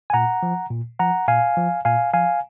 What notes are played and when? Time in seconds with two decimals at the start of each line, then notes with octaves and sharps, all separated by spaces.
0.10 G#5
0.13 A#2 F#5 A#5
0.43 F3
0.70 A#2
0.99 F3 F#5 A#5
1.28 A#2 F5 G#5
1.57 F3
1.85 A#2 F5 G#5
2.13 F3 F5 G#5